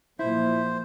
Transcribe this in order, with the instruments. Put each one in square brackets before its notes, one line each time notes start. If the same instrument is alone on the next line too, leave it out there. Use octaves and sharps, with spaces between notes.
[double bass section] A#2 F3 A#3 [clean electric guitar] E4 [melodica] C5